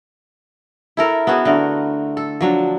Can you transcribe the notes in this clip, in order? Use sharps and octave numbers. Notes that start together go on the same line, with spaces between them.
E4 A4 A#4
B3 C#4 F#4 G#4
D3 A3 A#4
A4
F3 F#3 D4